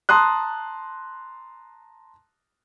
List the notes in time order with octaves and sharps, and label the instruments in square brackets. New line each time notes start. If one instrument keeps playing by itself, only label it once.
[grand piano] A5 A#5 C6 D#6 F#6